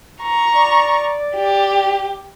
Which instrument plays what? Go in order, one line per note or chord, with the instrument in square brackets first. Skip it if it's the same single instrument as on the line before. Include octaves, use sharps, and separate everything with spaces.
[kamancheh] A#5 C#6
[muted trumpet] D5
[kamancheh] G4